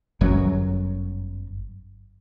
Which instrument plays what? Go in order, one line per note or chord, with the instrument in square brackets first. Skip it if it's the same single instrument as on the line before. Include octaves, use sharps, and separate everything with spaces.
[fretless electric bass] G1 F#2 F#3